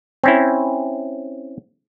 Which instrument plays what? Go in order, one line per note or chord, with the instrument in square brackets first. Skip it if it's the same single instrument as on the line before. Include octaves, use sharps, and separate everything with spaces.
[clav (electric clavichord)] C4 C#4 E4